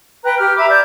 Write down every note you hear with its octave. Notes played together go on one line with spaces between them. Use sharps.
B4 G5 A#5 F#6
G4 F6
E5 A#5 B5 D6
D5 G6